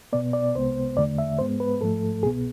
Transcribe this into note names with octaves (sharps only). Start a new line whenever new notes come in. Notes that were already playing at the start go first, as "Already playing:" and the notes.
B2 B3 D5
D5
C2 C3 G#3 B3 C5
E2 D3 A3 D5
E5
G#2 G#3 B3 C5
B4
G#2 F3 A3 A4
C2 B2 B3 G#4